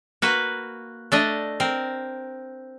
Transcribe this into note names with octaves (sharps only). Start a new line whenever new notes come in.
A#3 F#4 B4
A3 D4 D#5
C4 A#4